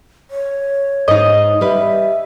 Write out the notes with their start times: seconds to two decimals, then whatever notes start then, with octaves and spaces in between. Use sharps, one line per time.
0.31 C#5
1.08 G#2 D#4 D#5
1.61 G3 B4 E5